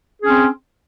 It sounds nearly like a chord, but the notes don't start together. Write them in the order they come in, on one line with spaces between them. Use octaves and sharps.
G#4 C#4 C4